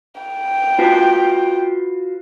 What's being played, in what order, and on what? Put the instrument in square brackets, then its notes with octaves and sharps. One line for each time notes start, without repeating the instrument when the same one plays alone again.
[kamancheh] G5
[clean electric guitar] F4 F#4 B4